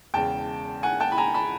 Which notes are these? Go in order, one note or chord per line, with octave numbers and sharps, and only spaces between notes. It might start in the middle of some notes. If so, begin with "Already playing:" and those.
E1 E2 C#3 G5 A5
F#5 G#5
G5 A5
B5
G#5 A#5
A5 B5